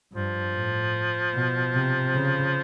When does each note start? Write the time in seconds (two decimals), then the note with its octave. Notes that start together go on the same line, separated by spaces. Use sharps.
0.13 G2 F3
0.53 A2
1.34 B2
1.74 C3
2.15 C#3